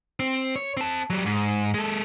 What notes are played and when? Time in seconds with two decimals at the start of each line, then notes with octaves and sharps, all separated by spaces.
0.20 C4
0.56 C#5
0.77 C4 A5
1.10 F#3 G3
1.25 G#2
1.74 G#3 A4